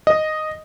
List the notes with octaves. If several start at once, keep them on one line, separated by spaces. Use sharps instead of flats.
D#5